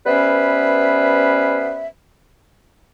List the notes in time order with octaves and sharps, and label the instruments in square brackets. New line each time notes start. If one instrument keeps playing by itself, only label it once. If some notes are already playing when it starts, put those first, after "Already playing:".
[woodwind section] G3 B3 C#4 B4 C5 E5